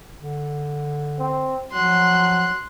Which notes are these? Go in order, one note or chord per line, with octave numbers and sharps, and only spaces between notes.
D3
C4
F3 F#3 C6 F#6